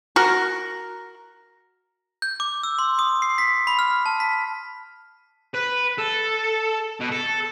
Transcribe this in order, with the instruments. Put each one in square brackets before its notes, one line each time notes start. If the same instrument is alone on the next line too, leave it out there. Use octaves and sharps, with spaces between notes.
[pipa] F#4 A#4
[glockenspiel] G6
D6
E6
C6
D#6
C7
B6
B5
F6
A5
B6
[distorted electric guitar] B4
A4
B2
A4